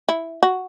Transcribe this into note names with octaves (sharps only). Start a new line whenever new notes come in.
E4
F#4